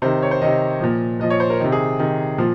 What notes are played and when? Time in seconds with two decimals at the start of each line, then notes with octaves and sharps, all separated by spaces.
0.02 C3 D#3 C5
0.23 C#5
0.31 C5
0.42 C3 D#3 D#5
0.80 A#2 F3
1.20 A#2 F3 D#5
1.30 C#5
1.40 C5
1.50 A#4
1.60 C3 D#3
1.72 G#4
1.99 C3 D#3
2.38 A#2 F3